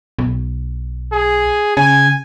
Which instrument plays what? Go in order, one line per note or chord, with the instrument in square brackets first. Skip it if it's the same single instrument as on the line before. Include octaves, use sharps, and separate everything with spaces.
[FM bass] B1
[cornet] G#4
[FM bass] C#3 [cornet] G#5